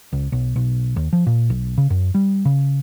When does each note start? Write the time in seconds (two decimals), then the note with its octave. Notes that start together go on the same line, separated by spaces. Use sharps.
0.13 C#2
0.32 B1
0.56 B1
0.96 D#2
1.13 F3
1.27 A#2
1.50 B1
1.78 C#3
1.90 F#2
2.14 G3
2.45 C#3